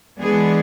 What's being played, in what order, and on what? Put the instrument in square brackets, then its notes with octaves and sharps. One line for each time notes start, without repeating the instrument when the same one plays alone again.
[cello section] E3 G#3 B3 D4 G#4